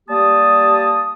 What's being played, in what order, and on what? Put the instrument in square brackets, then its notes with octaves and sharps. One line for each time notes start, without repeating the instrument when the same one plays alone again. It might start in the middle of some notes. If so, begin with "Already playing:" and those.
[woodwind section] G3 A#3 G4 A5 D#6